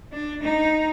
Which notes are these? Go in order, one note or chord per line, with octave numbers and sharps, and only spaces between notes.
D4
D#4